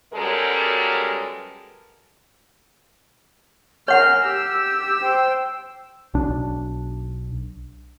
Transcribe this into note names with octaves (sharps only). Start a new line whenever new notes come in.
F#2 G3 G#3 B3 A4 A#4
A#4 C#5 F#5 G#5 F6
G4 E6
C5 G5
B1 D4